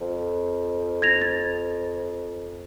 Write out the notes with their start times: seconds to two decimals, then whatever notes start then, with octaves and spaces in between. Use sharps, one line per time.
0.01 F2
1.02 G#6 A#6 F7
1.22 A6